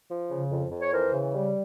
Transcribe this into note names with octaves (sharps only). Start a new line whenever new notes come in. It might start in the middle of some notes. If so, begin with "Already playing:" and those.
F3
C#3
F2
F2
C#5
E3 A#4 C5
C#3
G3